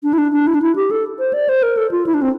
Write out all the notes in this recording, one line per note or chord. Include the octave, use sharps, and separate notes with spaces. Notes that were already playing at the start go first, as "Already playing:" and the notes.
D4
E4
D4
D4
E4
D4
E4
G4
A4
C5
D5
C5
A#4
A4
F4
E4
D4
C4